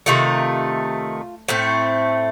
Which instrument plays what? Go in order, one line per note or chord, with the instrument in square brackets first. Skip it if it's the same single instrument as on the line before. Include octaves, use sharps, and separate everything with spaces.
[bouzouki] C3 D#3 A3 F4
A2 A3 C4